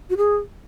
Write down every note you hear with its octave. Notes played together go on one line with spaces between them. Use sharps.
F#4
G#4